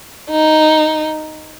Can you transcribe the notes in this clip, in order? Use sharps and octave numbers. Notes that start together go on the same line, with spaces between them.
D#4